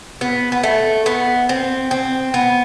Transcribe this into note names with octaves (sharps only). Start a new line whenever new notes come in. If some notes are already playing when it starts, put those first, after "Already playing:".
B3
B3
A3
B3
C4
C4
B3